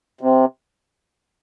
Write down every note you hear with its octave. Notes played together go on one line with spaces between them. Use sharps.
C3